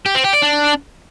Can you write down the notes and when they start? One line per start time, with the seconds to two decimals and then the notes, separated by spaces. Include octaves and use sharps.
0.06 G4
0.15 C4
0.24 G4
0.34 D5
0.43 D4